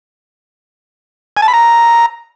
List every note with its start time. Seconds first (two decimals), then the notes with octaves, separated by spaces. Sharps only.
1.37 G#5
1.42 A5
1.48 B5
1.54 A#5